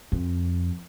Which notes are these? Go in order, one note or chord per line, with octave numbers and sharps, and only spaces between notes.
F2